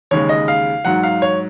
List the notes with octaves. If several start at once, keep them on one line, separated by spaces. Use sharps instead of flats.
D#2 C#3 G#3 C#5
D#5
F5
G#2 F#3 F#5
F5
C#5